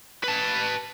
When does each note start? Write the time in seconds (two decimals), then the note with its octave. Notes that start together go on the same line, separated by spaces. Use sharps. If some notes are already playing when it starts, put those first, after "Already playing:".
0.24 B4 A5